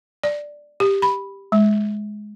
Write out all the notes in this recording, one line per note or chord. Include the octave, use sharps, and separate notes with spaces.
D5
G4
B5
G#3